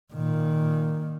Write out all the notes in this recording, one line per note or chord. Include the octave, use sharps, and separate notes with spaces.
A#2 D#3